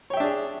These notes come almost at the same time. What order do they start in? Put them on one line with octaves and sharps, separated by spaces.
C#5 G5 E5 D4 G#4